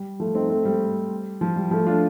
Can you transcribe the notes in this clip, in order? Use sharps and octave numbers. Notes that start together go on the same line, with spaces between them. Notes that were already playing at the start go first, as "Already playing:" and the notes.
Already playing: G3
F3 A3
C4 D#4
A3 C4
G3
F3
G3
F3 A3
D4 F4